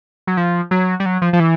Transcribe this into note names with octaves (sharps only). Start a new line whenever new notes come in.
F#3
F3
F#3
G3
F#3
F3
F3
E3